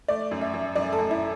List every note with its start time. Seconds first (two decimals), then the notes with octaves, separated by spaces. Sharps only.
0.08 A3 D5
0.31 F#2
0.41 E5
0.53 F#2
0.75 F#2 D5
0.93 A4
0.98 F#2
1.11 E4